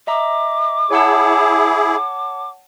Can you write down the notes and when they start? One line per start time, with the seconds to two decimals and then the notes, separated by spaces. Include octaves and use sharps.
0.07 D#5 E5 A#5 D6
0.91 E4 G#4 C#5 F#5 A5